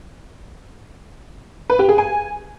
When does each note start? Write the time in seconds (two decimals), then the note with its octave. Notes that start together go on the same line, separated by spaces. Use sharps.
1.70 B4
1.79 G4
1.89 G#4
1.98 G#5